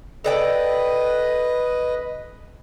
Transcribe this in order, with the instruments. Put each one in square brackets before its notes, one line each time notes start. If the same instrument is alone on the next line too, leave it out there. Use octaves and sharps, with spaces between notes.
[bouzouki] A4 D5 G5 [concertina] B4 D#5